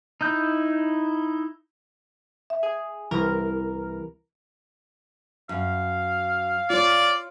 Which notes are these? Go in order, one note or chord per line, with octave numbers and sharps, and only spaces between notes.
D#4 E4 G6
E5
G#4
C2 E3 A#4
F#2 F5
F4 C#5 D5